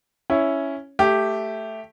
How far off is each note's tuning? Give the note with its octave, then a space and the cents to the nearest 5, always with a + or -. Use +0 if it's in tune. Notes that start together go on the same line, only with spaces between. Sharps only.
C#4 +0 E4 +0 C#5 +0
A3 +0 G4 +0